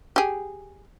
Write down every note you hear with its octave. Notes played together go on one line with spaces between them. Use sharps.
G4 G#4